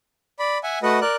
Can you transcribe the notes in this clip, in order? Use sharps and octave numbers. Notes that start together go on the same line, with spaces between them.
D5 B5
E5 F#5 G#5
A3 F#4 B4 D#5 F#5
A#4 D5 F#6